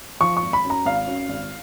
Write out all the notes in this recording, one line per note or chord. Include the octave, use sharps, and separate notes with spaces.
F3 C#6
C#6
G#1
B5
F#2
A#5
G#1 F5
F#2
G#1